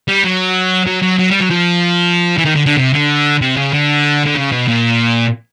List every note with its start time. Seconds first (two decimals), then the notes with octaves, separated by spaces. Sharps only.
0.08 G3
0.24 F#3
0.86 F#3
1.02 F#3
1.19 F#3
1.30 G3
1.40 F#3
1.50 F3
2.38 E3
2.45 D#3
2.56 D3
2.66 D3
2.77 C3
2.93 D3
3.41 C3
3.57 C#3
3.73 D3
4.26 D3
4.36 C#3
4.52 B2
4.68 A#2